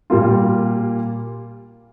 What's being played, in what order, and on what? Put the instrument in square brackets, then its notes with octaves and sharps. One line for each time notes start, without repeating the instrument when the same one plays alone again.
[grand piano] A#2 G3 A#3 F4